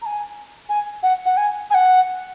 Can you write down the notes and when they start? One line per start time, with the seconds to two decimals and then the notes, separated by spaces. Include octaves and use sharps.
0.02 A#5
0.06 G#5
0.69 G#5
1.03 F#5
1.26 F#5
1.37 G#5
1.70 G#5
1.74 F#5